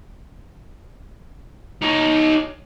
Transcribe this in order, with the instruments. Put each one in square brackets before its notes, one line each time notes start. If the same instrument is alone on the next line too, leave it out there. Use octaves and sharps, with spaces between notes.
[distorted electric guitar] D#4 C#5